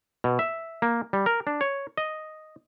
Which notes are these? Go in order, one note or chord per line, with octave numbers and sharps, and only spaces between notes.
B2
E5
A#3
G3
A#4
D4
C#5
D#5